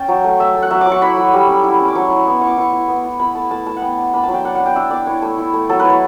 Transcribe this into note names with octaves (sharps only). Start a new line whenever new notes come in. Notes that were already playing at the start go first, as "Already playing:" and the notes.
Already playing: C#4 G5 A5
F#3
A3
A3 E5
A3
F#5
F#3 E5
D6
F#3 C#6
E4 B5
F#3
G3
C#4
E4
C#4
D6
F#3 C#6
E4
B3
E4 C#6
D6
E4 C#6
E4
B3
E4
E4 B5
A3 A5
A3 A5
A3 A5
F#5
B3 G5
D4
D4 B5
A5
F#3
G5
D4 F#5
D4 F#5
G5
D4 E5
D4 D5
E4 C#5
A3
E4
A3
F#3 A4
B4
E4
C#5